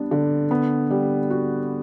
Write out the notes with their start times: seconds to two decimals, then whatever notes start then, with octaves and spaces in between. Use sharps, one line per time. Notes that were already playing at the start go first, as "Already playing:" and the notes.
Already playing: G3 B3 D4
0.11 D3
0.51 B3
0.91 G3
1.30 F#4